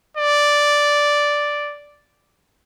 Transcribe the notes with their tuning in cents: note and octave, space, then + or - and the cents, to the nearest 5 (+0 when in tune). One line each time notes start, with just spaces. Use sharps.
D5 -5